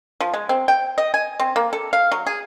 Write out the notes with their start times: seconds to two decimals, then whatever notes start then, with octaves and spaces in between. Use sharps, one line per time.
0.21 F3
0.34 G#3
0.49 C4
0.68 G5
0.98 D#5
1.14 G#5
1.40 C4
1.56 A#3
1.73 A4
1.93 F5
2.12 F#3
2.27 G#4